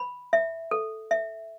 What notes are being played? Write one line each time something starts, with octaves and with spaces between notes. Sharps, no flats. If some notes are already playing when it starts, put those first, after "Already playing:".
Already playing: B5
E5
A4
E5